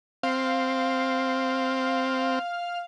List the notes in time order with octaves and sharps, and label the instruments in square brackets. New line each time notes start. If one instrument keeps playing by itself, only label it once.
[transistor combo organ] C4 [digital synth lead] F5